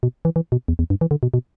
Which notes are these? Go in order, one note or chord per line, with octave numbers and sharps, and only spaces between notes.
B2
E3
E3
B2
E2
E2
G2
E3
D3
B2
B2